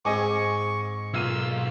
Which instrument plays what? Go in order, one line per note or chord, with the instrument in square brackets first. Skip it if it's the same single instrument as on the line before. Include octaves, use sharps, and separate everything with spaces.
[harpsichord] G#2 C4 G#4 [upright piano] D#5 G#5 D6 [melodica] C#6
[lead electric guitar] B1 [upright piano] A#3 F4 D#7 [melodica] E6